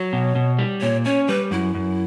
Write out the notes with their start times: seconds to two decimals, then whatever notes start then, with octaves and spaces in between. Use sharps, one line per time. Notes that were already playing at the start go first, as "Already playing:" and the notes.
Already playing: F#3 C#5
0.13 B2
0.35 B2
0.59 G3
0.81 A#2 C#5
1.05 C#4 C#5
1.28 G3 B4
1.51 F#2 E4
1.75 F#2